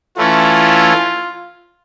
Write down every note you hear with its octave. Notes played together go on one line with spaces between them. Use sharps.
E3 A3 C#4 E4 F4